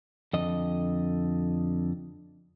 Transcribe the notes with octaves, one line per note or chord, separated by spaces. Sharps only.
F2 D3 D#5